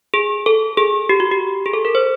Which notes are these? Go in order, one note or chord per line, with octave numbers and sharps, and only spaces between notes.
G#4
A4
G#4
G4
F#4
G4
G#4
A4
A#4
C5